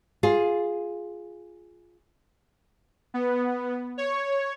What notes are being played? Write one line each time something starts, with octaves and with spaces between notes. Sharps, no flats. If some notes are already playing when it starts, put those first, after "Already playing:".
F4 G#4
B3
C#5